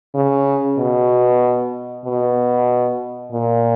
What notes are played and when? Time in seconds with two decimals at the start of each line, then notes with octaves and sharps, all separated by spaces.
0.15 C#3
0.79 B2
2.05 B2
3.32 A#2